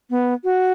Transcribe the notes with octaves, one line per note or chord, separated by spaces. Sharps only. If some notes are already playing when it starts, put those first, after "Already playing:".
B3
F#4